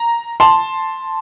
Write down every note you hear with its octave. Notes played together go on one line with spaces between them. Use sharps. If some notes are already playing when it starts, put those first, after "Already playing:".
Already playing: A#5
A5 C6